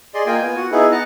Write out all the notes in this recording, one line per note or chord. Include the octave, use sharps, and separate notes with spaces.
G#4 D5 D#5 C6
A#3 F4 D#5 G5 G#5
B3 F4 G#5
F#4
B3 D#4 E4 G#4
D#5 F#5 A5 A#5